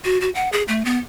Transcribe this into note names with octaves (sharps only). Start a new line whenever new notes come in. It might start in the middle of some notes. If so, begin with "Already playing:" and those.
F#4
F#4
F#5
G#4
A3
B3